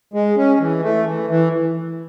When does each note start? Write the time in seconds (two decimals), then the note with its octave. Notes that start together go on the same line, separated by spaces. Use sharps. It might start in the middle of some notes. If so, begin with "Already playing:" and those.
0.14 G#3
0.37 C#4
0.60 E3
0.83 A3
1.06 E3
1.30 E3